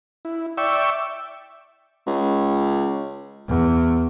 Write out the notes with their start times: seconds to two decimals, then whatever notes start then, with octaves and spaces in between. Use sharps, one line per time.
0.25 E4
0.57 D5 E5 G5 C#6 E6
2.06 C#2
3.48 E2